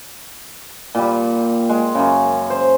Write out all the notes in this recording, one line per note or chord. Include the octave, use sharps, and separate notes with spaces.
A#2 G3
G#3
F#2 C#3
C5